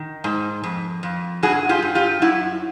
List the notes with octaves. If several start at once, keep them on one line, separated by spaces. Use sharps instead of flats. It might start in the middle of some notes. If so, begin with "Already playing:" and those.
Already playing: D#3
G#2
F2
F2
G2 F#4 G#4
F4 G4
G2
F4 G4
F#2 E4 F#4